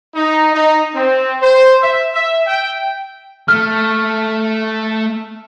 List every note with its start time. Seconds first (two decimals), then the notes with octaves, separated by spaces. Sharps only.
0.15 D#4
0.54 D#4
0.95 C4
1.41 C5
1.82 E5
2.14 E5
2.47 G5
3.48 A3 F6